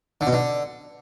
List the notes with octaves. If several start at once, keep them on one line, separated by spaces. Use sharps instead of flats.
D3
B2
D3